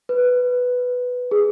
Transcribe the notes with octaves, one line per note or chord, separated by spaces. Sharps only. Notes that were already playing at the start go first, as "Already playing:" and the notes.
B4
G#4